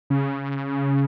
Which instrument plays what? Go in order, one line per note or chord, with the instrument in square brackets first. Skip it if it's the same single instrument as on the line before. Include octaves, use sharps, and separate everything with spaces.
[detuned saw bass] C#3